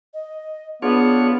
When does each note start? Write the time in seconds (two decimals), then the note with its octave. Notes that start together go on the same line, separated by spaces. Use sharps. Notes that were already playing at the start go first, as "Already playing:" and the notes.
0.14 D#5
0.82 B3 D4 F4 G#4 C#5